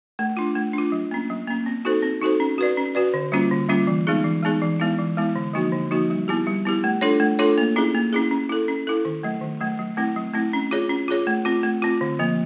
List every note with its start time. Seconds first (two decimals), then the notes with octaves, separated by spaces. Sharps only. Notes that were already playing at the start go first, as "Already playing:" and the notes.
0.19 A3
0.37 D4 F4
0.55 A3
0.73 D4 F4
0.92 F#3
1.11 A#3 C#4
1.30 F#3
1.48 A#3 C#4
1.66 C4
1.85 D#4 F#4 A4 C5
2.03 C4
2.21 D#4 F#4 A4 C5
2.40 C#4
2.58 F#4 B4 D5
2.77 C#4
2.95 F#4 B4 D5
3.14 D3
3.32 G3 A#3 C#4 F4
3.51 D3
3.69 G3 A#3 C#4 F4
3.87 E3
4.07 G#3 B3 D#4 G#4
4.24 E3
4.43 G#3 B3 D#4 G#4
4.62 E3
4.80 G#3 B3 E4
4.99 E3
5.17 G#3 B3 E4
5.36 D3
5.53 F3 A#3 D#4 F#4
5.72 D3
5.91 F3 A#3 D#4 F#4
6.10 G3
6.28 B3 E4 G4
6.47 G3
6.65 B3 E4 G4
6.84 A3
7.01 D4 F4 A4 C#5
7.20 A3
7.39 D4 F4 A4 C#5
7.58 A#3
7.76 C#4 E4 G#4
7.95 A#3
8.13 C#4 E4 G#4
8.31 C#4
8.49 E4 A4
8.68 C#4
8.87 E4 A4
9.05 D#3
9.23 F#3 A3
9.41 D#3
9.61 F#3 A3
9.79 F#3
9.97 A3 C4 E4
10.16 F#3
10.34 A3 C4 E4
10.53 C#4
10.71 F4 G#4 C#5
10.89 C#4
11.08 F4 G#4 C#5
11.27 A3
11.45 C4 F4
11.63 A3
11.82 C4 F4
12.01 D3
12.19 F3 A#3